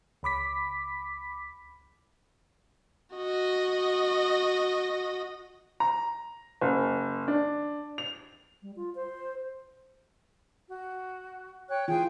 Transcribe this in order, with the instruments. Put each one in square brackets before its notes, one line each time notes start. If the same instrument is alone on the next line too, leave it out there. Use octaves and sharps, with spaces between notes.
[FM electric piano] C#2 B5 D6 B6
[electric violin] F#4 D#5
[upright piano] A#5
F#1
D4
F7
[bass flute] G3
F4
C5
[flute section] F#4
C#5 G5 F#6
[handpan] E3 F4 [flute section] G#4 G5